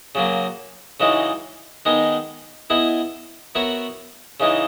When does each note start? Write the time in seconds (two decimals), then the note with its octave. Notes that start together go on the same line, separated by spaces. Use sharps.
0.15 C#3 F#3 A#3
1.00 C#3 E3 G#3 D#4 F#4
1.85 D#3 G#3 B3 D#4 G#4
2.70 B3 E4 G#4 D#5
3.55 B3 F#4 A#4 C#5 E5
4.40 C#3 E3 G#3 D#4